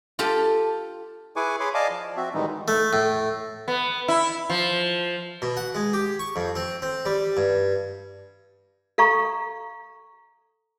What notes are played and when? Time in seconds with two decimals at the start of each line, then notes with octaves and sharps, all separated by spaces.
0.19 F4 G4 A4
1.36 E4 G#4 B4 G#5 C#6 D6
1.60 G#4 C#5 B5 C6 D6
1.74 D5 D#5 F5 G#5 A5 D6
1.91 F3
2.17 C4 F#4 E5
2.34 A2 D#3 E3 G3 G#3 D#4
2.68 A3
2.93 A2
3.68 B3
4.08 E4
4.50 F3
5.42 B2
5.57 F#5
5.75 G#3
5.93 G4
6.19 C#6
6.36 F2
6.56 C4
6.82 C4
7.05 G3
7.37 G2
8.98 A4 F5 A#5 C#6